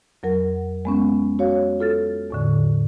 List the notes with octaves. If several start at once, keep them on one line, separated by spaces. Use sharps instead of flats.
F2 F#3 A#4 F#5
G#3 B3 C#4
F#4 C#5 F5
F4 A4 F6 A6
E2 A2 D3